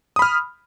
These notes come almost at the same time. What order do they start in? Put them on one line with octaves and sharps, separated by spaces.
D#6 B5 F6